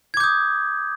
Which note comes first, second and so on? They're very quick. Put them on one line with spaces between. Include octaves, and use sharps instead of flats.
G#6 D6 G6 D#6